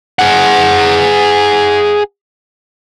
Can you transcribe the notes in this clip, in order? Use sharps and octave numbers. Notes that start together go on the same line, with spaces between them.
G#4 F#5